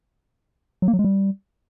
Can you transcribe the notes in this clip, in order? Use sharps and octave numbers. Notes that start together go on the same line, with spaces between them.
F#3
A#3
F#3
G#3
G3